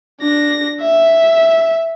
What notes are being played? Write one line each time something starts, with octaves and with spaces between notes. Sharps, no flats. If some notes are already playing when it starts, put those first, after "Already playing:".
D4 A#6
E5